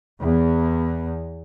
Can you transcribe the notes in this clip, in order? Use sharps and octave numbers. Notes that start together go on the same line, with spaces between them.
E2